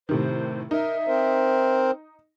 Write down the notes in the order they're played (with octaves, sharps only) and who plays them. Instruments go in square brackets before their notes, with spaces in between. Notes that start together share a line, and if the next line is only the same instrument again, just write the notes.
[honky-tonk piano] A2 C3 D#3 [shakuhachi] C5
[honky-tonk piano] D#4 [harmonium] A#4 [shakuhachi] E5
[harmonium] C4 A#4 C5